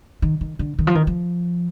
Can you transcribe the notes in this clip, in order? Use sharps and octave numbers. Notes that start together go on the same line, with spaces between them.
D#3
D#3
D3
D#3
F3
D#3
F3